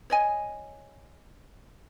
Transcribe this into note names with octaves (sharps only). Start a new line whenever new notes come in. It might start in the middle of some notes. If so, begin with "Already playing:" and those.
C#5 D#5 G#5